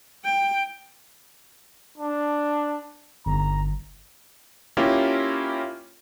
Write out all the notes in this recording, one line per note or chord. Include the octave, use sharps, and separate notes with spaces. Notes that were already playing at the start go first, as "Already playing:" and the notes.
G5
D4
G1 A#5
A#3 C#4 E4 F4 G4 A#4